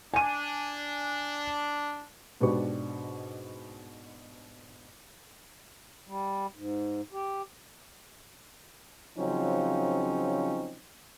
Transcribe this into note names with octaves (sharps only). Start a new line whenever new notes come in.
D4 G#5 D#7
G#2 B2 D4 G4 B4 C#6
G3
G#2
G4
C#3 F3 F#3 C4 C#4 D#4